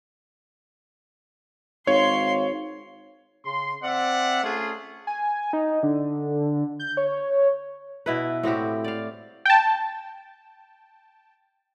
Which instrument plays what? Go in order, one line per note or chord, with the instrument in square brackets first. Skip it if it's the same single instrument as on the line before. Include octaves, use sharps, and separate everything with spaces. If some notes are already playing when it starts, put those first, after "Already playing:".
[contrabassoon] G#1 [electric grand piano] C#5 [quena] F5 [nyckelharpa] C6
[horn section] C#3 C6
C4 D5 E5 F#5
A3 C#4 F4 G#4
[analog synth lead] G#5
D#4
D3
G6
C#5
[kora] B2 E4 B4
A2 C4 F#4 G4
D5 F5
[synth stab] G5 A5